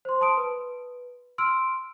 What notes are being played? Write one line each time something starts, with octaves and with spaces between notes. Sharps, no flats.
C5 C6
A5 C6 D#6 D7
B4
C6 E6 F6 D7